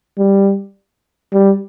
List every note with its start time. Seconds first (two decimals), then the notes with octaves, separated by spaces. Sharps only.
0.18 G3
1.33 G3